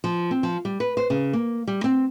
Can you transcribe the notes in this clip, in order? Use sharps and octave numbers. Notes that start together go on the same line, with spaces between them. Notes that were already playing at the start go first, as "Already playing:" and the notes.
F3
C4
F3
G3
B4
C5
C#3
A#3
G3
C4